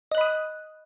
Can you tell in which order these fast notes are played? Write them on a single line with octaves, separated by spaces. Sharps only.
D#5 F#6 B5 D#6